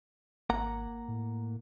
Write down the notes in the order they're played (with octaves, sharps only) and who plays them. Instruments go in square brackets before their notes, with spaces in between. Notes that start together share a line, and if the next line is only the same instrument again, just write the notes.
[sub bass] G#1 [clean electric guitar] A#3 F#5 A#5
[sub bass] A2